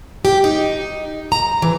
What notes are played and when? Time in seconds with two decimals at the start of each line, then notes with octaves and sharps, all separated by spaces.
0.25 G4
0.44 D#4
1.32 A#5
1.62 E3